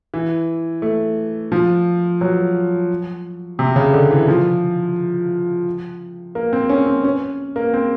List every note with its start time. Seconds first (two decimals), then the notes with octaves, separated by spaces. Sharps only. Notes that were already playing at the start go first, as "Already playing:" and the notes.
0.14 E3
0.82 A3
1.52 F3
2.21 F#3
3.59 C3
3.76 C#3
3.93 D3
4.11 E3
4.28 F3
6.35 A#3
6.53 C4
6.69 C#4
6.86 C4
7.04 C#4
7.56 A#3
7.74 C4